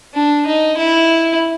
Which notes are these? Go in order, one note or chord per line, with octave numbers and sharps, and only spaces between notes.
D4
D#4
E4